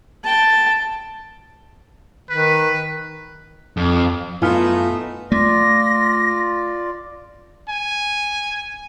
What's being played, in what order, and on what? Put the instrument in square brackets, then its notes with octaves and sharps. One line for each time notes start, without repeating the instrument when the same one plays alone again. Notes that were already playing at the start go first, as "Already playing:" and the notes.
[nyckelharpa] G5 A5
[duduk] D#3 [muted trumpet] B4
[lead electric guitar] F2
[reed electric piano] F#2 G#5 F6 [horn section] A3 B3 D#4 [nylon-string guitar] F4
[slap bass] A3 [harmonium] F4 D5 [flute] A#6
[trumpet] G#5